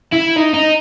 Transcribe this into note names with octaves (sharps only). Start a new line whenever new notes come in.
E4
D#4
D#4